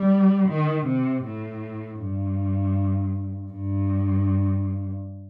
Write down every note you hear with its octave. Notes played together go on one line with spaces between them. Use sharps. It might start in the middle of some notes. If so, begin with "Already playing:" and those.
Already playing: G3
D#3
C3
A2
G2
G2